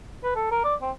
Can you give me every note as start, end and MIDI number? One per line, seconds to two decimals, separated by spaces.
0.23 0.35 71
0.36 0.48 69
0.51 0.59 70
0.64 0.75 74
0.82 0.91 60